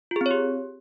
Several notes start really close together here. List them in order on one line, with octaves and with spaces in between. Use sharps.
F4 G#4 C4 C#5 G4